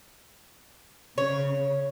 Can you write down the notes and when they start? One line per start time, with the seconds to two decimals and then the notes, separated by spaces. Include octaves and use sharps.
1.18 C#3 C#5